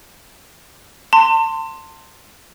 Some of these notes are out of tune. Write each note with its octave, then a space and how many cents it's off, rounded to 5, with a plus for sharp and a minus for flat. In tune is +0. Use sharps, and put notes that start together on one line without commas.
A5 +40 C6 +0